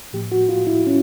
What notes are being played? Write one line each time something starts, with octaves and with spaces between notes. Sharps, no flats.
A2 F3 A#3 G4
F#4
F4
E4
C#4